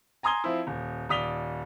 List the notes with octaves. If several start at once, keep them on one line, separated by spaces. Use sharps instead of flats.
G#5 A#5 C6 D#6 G#6 G7
F3 C4 E4
D#1
D#1 D5 D#6 B6 F7 G7